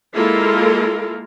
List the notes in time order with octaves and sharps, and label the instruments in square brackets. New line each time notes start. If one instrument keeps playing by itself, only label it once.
[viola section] G#3 A#3 E4 F4 A4 A#4